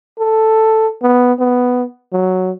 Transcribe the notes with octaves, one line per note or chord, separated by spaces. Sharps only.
A4
B3
B3
F#3